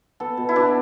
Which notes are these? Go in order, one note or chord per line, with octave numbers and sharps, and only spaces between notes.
B3 A4
B2
E4
B2 D4